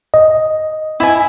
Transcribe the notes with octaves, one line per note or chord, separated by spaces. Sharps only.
D#5
E4 G#5